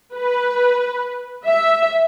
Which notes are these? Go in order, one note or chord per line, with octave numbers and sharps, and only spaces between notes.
B4
E5